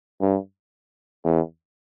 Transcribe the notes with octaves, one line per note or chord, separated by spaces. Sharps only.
G2
E2